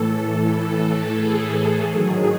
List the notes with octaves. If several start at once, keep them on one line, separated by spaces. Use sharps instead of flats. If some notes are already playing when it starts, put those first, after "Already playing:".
Already playing: A2 E3 A4
G#4
G#2 D#3 F#3